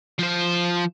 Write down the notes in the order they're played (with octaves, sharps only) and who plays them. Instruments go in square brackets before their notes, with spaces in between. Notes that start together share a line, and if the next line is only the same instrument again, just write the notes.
[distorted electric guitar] F3 C5